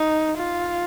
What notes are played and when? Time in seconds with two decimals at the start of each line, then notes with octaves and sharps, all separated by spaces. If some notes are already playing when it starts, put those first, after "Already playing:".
Already playing: D#4
0.37 F4